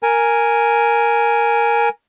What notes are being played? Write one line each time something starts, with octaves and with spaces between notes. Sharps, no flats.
A#4 G#5